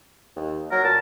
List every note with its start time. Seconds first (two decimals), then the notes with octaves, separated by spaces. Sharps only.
0.36 D#2
0.71 F#3 A#4
0.84 A#2 A5